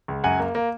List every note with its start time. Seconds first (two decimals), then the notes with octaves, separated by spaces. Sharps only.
0.08 C#2
0.24 F#2 F#5 G#5
0.39 A#3
0.55 A#3